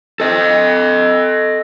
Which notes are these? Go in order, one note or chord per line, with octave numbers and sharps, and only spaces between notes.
A4 D#5